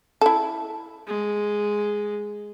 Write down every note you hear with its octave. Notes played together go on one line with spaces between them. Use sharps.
E4 A4
G#3